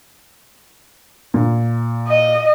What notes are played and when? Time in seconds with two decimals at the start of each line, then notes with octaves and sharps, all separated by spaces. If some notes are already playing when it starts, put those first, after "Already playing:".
1.34 A#2
2.08 D#5